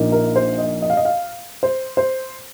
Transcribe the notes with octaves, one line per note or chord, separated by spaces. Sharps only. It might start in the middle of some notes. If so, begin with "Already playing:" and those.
Already playing: A#1 A#2 A#3 D#4
A#4
C5
D#5
D#5
F5
D#5
F5
C5
C5